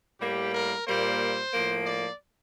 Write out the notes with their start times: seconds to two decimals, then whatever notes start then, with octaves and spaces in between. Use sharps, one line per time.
0.21 A2 G3 A#3 G4
0.54 A#4
0.87 A#2 G3 A#3 C5
1.53 A2 F3 A#3
1.86 D5